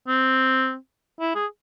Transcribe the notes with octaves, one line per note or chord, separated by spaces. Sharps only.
C4
E4
G#4